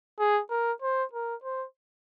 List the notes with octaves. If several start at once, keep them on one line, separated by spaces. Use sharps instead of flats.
G#4
A#4
C5
A#4
C5